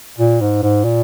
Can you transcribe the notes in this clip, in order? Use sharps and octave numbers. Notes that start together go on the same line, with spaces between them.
A#2
G#2
G#2
A#2